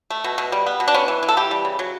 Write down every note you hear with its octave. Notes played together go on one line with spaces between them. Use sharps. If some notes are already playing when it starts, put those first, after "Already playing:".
A3
B2
B2
G3
B3
B2
D4
B3 C#4
E3
E3
A4
E3 G4
G3
C#3
F#3